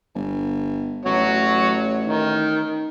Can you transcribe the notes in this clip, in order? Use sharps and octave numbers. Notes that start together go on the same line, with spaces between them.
G1
A1 F#4 C#5
D#3